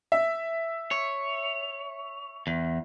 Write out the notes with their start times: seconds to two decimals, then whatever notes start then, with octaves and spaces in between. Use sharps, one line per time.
0.12 E5
0.91 C#5
2.47 E2